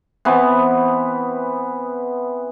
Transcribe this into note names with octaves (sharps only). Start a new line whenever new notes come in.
E3 B3 C4